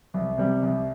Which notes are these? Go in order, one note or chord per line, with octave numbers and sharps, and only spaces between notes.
C2
C3 G3
C2